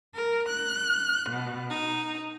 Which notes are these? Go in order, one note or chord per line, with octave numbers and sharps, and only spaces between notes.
A#4
F#6
B2
D#4